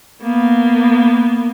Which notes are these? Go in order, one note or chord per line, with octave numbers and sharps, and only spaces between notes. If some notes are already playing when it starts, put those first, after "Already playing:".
A#3 B3